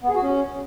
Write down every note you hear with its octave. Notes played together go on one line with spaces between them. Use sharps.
B3
G#4
F#4
C#4